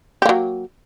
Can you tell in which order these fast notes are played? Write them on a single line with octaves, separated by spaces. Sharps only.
G4 A#3 F#3